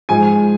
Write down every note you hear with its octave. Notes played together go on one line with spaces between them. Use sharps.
G#2 F3 G#5